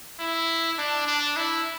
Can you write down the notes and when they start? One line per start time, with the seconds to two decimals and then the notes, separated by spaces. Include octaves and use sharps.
0.19 E4
0.78 D4
1.07 D4
1.36 E4